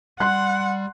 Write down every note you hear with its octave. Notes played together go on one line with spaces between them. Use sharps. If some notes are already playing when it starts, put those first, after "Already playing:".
G3 F#5 C6 F#6